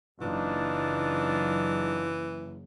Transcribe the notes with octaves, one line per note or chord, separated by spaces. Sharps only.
F#1 E3 D4 D#4 F4